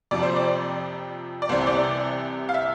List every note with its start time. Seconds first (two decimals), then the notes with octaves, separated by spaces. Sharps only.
0.11 F2 C3 F3 D5
0.23 C5
0.36 D5
1.42 D5
1.49 C2 C3 E3 C5
1.67 D5
2.49 F5
2.54 E5